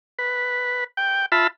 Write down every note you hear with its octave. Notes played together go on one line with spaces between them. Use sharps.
B4
G5
F4 E5 A5 B5